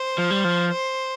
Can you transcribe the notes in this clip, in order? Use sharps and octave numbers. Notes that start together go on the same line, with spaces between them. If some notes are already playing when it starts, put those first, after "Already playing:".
Already playing: C5
F3
G3
F3
C5